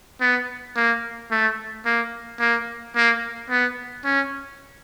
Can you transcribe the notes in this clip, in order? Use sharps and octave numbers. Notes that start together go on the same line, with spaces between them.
B3
A#3
A3
A#3
A#3
A#3
B3
C#4